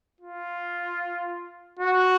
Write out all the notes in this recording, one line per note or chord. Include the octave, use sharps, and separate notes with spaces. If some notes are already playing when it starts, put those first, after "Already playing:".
F4
F#4